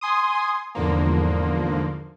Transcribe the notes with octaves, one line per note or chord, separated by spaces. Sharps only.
G#5 C6 D#6
E2 G#2 D3 F3 A#3